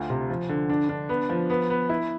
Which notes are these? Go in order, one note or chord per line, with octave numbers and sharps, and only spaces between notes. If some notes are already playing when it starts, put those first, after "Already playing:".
Already playing: D2 F4
C3
F3
D3
D4
D4
B3
F3
B3
B3
E4